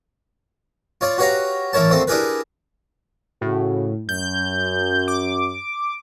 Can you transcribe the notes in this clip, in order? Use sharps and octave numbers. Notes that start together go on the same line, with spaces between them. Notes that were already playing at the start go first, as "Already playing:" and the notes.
F4 C#5 D5
F#4 G4 B4 C#5 F5 A#5
A1 E4 A#4 C#5 A5
D2 A3 A#3 C4 A4
D4 E4 G4 G#4 A#4 B4
A2 C#3 F#4
F#2 G6
D6